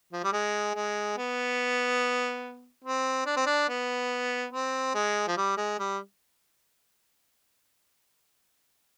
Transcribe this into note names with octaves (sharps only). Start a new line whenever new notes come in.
F3
G3
G#3
G#3
B3
C4
D4
C4
D4
B3
C4
G#3
F3
G3
G#3
G3